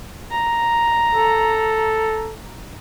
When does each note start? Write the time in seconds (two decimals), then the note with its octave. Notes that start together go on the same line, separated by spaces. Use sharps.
0.31 A#5
1.14 A4